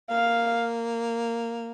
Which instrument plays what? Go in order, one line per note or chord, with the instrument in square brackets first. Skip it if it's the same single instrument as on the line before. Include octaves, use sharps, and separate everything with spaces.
[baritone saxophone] A#3 [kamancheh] F5